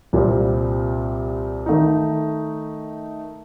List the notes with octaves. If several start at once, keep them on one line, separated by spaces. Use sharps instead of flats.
C2 A#2 G3 C4
D#3 A3 D#4